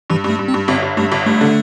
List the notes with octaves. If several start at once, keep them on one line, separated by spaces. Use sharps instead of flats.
G2 E3
G2
A3
G2
C4
G2
G1 C4
G1
G2 A3
G1
G2 A3
D3